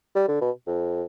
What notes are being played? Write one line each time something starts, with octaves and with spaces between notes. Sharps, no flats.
G3
D3
B2
F2